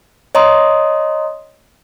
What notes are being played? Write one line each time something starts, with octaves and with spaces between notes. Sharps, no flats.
C#5 D#5 A#5 C6 D#6